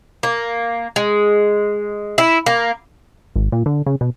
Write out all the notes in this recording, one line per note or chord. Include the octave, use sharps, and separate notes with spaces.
A#3
G#3
E4
A#3
G#1
A#2
D3
C#3
B2